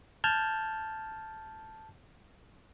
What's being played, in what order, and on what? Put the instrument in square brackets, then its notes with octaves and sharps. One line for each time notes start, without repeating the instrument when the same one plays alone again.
[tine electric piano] A5 F6 G6 G#6